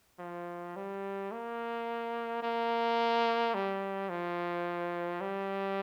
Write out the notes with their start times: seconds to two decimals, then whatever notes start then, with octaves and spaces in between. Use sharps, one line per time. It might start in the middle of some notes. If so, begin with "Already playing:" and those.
0.19 F3
0.76 G3
1.32 A#3
2.42 A#3
3.54 G3
4.09 F3
5.21 G3